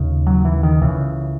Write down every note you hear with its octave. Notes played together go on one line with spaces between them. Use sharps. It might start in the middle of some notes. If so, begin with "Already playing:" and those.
Already playing: D#2 C#3
F#3
E3
D#3
C#2 C#3 E3